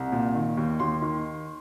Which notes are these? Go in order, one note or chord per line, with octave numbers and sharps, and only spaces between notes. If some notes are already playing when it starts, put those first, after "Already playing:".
Already playing: C2
A#2
D#3
D#2
D#2 C6
D#3